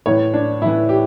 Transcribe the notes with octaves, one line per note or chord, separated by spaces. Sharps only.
A2 E3 C#5
D4
A2 E3 E4
G4